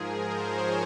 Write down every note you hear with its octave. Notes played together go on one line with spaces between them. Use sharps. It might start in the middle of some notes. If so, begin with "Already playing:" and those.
Already playing: G#2 F3 G#4 A#4
C5
C#5